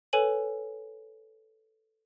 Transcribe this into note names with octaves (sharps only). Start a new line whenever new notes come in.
A4 B4 C#5 G#5 D#7 F#7